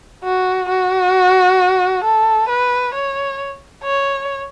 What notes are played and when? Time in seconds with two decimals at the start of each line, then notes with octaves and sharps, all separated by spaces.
0.24 F#4
0.69 F#4
2.04 A4
2.49 B4
2.95 C#5
3.84 C#5